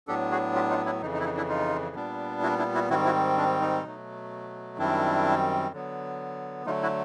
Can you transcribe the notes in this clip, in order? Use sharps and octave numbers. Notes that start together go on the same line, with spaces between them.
A2 F#3 B3 D4 G4 A4
F#4 G#4
F4 G4
D#4 F4
D4 E4
F2 C#3 E3 D#4
D#4
E4
D#4
D4 E4
D#4 F4
A#2 G3 B3 D4
E4 F#4
D4 E4
E4 F#4
G#2 D#3 G3 C4 E4 F#4
E4 F#4
D4
D#4
B2 F#3 A3
F#2 D#3 G3 C4 D4 E4
D3 F#3 B3
D3 F#3 A3 D#4 F4
E4 F#4